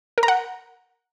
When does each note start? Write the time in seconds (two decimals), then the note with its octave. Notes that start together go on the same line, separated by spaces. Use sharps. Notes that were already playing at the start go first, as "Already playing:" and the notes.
0.18 A#4
0.23 A#5
0.28 F#5